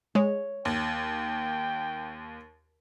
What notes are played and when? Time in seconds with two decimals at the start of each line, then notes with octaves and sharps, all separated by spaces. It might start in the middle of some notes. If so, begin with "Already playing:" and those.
0.15 G#3 C#5
0.65 D#2 G5